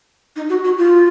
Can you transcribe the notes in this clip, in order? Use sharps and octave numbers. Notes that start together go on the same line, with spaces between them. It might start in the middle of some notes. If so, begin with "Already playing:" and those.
D#4
F#4
F#4
F4